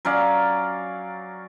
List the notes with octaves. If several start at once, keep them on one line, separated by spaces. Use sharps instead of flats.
F#3 C#4 D5 F5